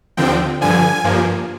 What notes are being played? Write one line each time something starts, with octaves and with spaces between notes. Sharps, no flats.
D#2 D3 F3 C4 G5
G2 D3 F3 G#5
G2 F3 A#3